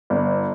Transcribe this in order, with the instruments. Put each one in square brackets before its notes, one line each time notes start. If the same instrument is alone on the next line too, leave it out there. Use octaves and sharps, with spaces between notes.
[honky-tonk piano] G1